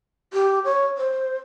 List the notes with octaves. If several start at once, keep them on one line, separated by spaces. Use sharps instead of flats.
G4
C#5
C5